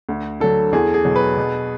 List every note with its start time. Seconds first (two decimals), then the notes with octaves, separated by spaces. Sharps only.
0.09 D2
0.40 D3 F#3 A4
0.73 E2 G#4
0.94 G#4
1.05 B2 F#3
1.16 B4
1.37 B2